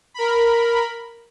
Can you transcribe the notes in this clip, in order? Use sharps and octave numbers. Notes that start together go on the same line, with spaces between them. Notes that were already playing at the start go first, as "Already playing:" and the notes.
A#4 B5